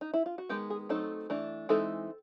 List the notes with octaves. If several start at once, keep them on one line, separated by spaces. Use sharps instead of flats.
D#4
E4
F4
F#4
D#3 G#3 B3 G4
G#4
F#3 A3 C4 D#4 A4
E3 A3 D4
E3 G#3 C4 D#4 A4